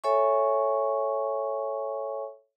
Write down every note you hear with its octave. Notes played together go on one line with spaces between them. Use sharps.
A4 C#5 E5 G#5 C#6